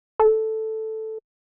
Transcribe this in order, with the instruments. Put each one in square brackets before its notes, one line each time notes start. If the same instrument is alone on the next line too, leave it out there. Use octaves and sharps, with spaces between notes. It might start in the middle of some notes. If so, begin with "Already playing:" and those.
[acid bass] A4